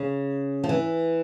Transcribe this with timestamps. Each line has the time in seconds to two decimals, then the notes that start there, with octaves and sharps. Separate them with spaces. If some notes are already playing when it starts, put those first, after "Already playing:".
Already playing: C#3
0.64 F3
0.69 E3